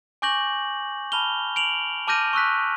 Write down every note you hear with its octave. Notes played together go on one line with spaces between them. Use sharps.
G#5 C#6 D6 G6 A#6 F#7
A5 B5 F6 F7 G7
D7 F7 F#7
A5 D6 F6 G6 A#6 D#7
C#6 E6 F#6 B6